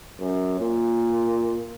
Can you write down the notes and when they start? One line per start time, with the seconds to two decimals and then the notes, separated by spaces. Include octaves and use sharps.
0.20 F#2
0.60 A#2